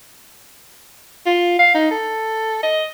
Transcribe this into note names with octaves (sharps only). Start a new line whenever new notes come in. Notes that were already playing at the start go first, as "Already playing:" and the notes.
F4
F5
D#4
A4
D#5